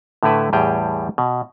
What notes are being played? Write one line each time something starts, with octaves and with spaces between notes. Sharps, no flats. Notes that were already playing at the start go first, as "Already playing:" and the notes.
A2 D3 A3 E4 B4 E5
E2 A2 G3 G4 G#4 G5
B2